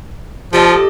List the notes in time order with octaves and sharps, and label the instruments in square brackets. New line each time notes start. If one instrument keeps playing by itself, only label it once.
[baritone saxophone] F3 [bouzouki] G4 A4 D#5